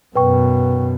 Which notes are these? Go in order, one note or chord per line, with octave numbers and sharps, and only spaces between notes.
F#2 B2 B4 G5 C#6